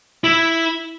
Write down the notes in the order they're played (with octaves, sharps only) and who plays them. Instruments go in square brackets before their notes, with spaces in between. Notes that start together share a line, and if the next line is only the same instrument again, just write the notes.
[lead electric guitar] E4